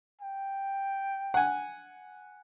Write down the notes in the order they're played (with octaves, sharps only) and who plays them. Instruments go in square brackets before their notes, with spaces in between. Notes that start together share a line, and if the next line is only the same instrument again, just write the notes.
[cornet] G5
[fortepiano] F#5 G#5